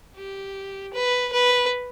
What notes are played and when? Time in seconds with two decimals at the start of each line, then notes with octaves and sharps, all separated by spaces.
0.16 G4
0.93 B4
1.32 B4